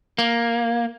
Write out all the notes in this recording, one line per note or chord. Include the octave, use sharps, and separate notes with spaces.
A#3